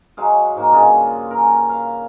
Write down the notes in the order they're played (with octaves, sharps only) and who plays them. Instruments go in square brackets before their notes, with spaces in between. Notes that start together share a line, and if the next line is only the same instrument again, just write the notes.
[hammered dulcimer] F#3 G#3 F5
G#2 D#3 A#3
G2 C#3 G#3 F4
C#4 A#4
F5